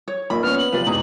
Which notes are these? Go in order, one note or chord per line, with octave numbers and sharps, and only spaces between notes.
C#5
A#1 D#3 B5
B3 C#4 D4 F6
F#7
C3 F3 B4 D5 F5
E2 G#2 B2 G#4 A#5